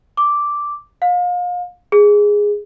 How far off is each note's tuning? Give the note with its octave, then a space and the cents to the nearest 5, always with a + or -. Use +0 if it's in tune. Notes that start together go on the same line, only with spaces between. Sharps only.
D6 -5
F5 +35
G#4 -5